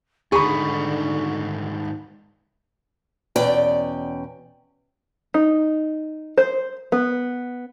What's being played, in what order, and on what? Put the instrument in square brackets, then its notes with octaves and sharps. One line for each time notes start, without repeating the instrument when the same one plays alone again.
[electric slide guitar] G#2 D#3 G3 [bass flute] D3 [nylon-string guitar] G#4 [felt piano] B5 C#6
[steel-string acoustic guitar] E2 B2 C#4 D5 G5
[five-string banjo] D#4
C5
B3